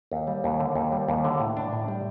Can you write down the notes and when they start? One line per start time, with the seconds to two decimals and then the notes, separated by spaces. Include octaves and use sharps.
0.12 D#2
0.27 G3
0.44 D#2
0.60 D3
0.75 D#2
0.92 G3
1.08 D#2
1.24 D3
1.40 A2
1.57 D4
1.73 A2
1.88 G3